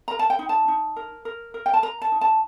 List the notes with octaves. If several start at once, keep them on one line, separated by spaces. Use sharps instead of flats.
A#4 A#5
A5
G5
D#4
A5
D#4
A#4
A#4
A#4
G5
A5
A#4 A#5
A5
D#4
A5